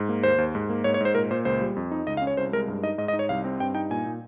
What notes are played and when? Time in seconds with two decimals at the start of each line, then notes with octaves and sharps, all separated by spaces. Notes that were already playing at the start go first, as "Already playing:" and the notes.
Already playing: G#2
0.09 A#3
0.23 D#2 C5
0.38 D#2
0.55 G#2
0.70 A#3
0.84 G#2 C#5
0.94 C#5
1.01 G#2 C5
1.15 A#2 A#4
1.31 A#2 C5
1.45 C#2 C5
1.61 G3
1.76 F2
1.91 D#4
2.07 C#2 D#5
2.17 F5
2.22 C#4
2.27 C#5
2.37 C2 C5
2.53 G#3 A#4
2.68 G2
2.83 D#4 D#5
2.98 G#2 D#5
3.08 D#5
3.13 D#4
3.19 C#5
3.29 C2 F5
3.44 C4
3.60 G2 G5
3.75 D#4 G5
3.90 A#2 G#5
4.06 A#2